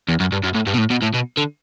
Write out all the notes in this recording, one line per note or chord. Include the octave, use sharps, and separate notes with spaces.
E2
F#2
G2
F#2
A2
G2
B2
A2
B2
A2
B2
D3